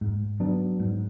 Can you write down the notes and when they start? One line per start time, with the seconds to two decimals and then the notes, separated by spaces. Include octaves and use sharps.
0.01 G#2
0.40 F#3 B3 D4
0.79 G#2